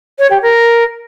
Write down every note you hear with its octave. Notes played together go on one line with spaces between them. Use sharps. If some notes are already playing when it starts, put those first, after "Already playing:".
C#5
G4
A#4